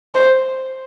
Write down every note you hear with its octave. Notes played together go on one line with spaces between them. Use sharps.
C5